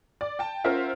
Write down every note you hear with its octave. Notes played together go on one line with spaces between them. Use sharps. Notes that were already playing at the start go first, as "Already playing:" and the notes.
D5
G5 A5
C#4 F4 A#4 C5 E5 F#5